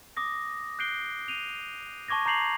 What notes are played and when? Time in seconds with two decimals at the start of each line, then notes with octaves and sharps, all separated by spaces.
0.17 D6 D#6 A#6
0.79 F#6 G6 C7 D7 G7
1.28 D#7 F7
2.08 A5 C#6 D6 G#6 A#6
2.26 A#5 D6 G6 C7 F7 F#7